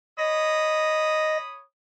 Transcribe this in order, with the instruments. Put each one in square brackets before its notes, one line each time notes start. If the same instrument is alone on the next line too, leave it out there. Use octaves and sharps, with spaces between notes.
[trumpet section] C#5 B5 D#6 [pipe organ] D#5 A#6